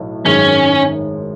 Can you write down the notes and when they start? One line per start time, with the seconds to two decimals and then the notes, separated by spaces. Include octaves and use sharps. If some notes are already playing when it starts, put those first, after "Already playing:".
Already playing: B1 A2
0.24 G#1 F#2 D#3 G#3 C#4